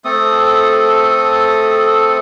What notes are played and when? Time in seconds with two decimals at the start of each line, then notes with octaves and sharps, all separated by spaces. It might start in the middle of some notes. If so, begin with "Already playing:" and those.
0.05 A3 C4 A4 D#6